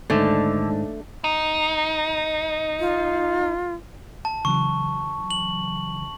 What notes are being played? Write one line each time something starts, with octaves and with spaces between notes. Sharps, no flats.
D#2 G#2 D3 A3 D#4
D#4
F4
A5
C#3 E3 F#3 C#6
F#7